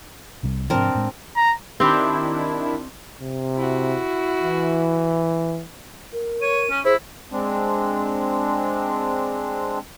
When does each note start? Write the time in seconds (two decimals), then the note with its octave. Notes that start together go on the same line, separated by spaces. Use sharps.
0.43 C2 C3 G3
0.70 G#2 C3 F3 C4 D4 A#4
0.95 A2 G#3
1.36 A#5
1.80 D#3 C4 D4 E4 G4
3.21 C3
3.56 E4 F#4
4.43 E3
6.13 A#4
6.42 C#5 D#7
6.70 C#4
6.85 E4 G#4 C5
7.32 G#3 C4 D4